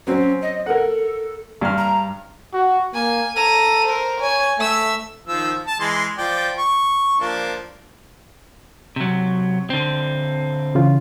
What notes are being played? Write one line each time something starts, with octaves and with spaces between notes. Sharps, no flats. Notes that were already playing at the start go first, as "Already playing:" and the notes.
F#3 C4 C#4
D#5
A4 A#4 F#5
G2 F6
A#5
F#4
A#3 G#5
A4 A#5 D#7
A#4 C5
C#5 G#5
A3 E5 E6
D#3 F3 E6
A5
E3 G#3 C6
F3 D5 G5
C#6
F3 A#3 D4
C3 F#3
D3 C4
C#3 E3 F4